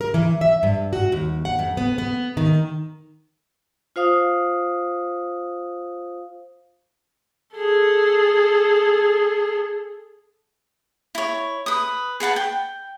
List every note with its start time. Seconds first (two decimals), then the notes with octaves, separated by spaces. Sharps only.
0.01 A#4
0.14 E3
0.41 E5
0.63 G2
0.93 F#4
1.12 D#2
1.45 F#5
1.59 F2
1.77 B3
1.98 B3
2.37 D#3
3.96 F4 C5 F5 D#6
7.56 G#4 A4
11.15 E4 C#5
11.66 B4 D#6
12.20 G#4 B4 F#5 A5
12.36 G5